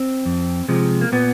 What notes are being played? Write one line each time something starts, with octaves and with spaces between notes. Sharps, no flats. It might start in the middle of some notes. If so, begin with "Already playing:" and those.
Already playing: C4
F2
C3 F3 G#3
A#3
A#2 B3